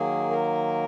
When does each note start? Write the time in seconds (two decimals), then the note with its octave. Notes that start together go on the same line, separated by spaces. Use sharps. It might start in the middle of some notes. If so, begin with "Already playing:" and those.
Already playing: D#3 F#3 A#3 G#4
0.30 A#4